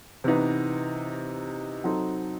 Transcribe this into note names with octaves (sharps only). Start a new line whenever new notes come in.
C3 E3 B3 D#4
F#3 C4 D#4 A4